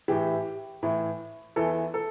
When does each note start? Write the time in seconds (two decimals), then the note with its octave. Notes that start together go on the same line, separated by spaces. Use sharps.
0.08 A2 E3 G4
0.83 A2 E3
1.56 E2 E3 A4
1.94 A4